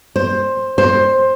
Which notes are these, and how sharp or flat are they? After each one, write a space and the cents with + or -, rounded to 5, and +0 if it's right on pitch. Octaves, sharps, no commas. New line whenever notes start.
C5 +15
C5 +15